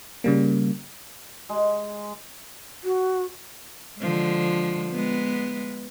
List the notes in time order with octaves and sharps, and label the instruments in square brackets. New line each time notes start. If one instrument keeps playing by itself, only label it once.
[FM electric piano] C#3 G3 A#3
[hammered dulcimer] G#3
[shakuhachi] F#4
[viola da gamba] D3 F3 G#3
G#3 B3